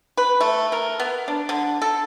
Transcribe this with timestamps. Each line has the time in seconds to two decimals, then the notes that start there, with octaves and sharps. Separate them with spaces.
0.17 B4
0.41 A3
0.72 A#4
1.00 B3
1.28 D4
1.49 D3
1.82 A4